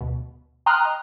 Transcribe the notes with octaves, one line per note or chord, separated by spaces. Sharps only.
D2 B2
G5 A#5 C6 D#6 F6 F#6
D#5